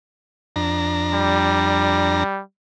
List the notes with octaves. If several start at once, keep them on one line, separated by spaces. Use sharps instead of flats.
F2 D4 A#5
G3